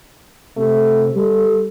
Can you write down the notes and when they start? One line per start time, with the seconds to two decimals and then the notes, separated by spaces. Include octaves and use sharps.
0.57 C3 A3
1.16 G3 A4